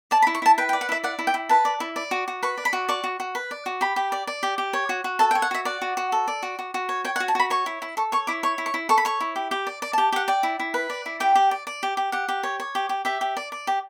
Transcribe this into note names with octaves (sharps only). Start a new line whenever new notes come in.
D5 A5
B5
E4
C#6
E4 A5
B4 G5
G5
D5
F#5
E4 E5
D5 F#5
E4
G5
E4
B4 A5
D5
E4
D5
F#4
F#4
B4 C#6
D5
B5
F#4
D5 C#6
F#4
F#4
B4
D5
F#4
G4 B5
G4
D5
D5
G4
G4
C#5
F#4
F#4
A4 A5
G5
C#5
F#5
F#4 E5
D5 F#5
F#4
F#4
A4
D5
F#4
F#4
F#4
C#5
C#5 G5
F#5
F#4
A5
F#4 B5
C#5 C#6
E4
E4
A4 C#6
C#5 C#6
E4 D6
C#5 C#6
E4
C#6
E4
A4 C#6
B5
C#5 C#6
E4
G4
G4
D5
D5
A5
G4
G4 F#5
D5 G5
E4
E4
B4
D5
E4
G4 G5
G4
D5
D5
G4
G4
G4 F#5
G4
C#5
C#5
G4
G4
G4 E5
G4
D5
D5
G4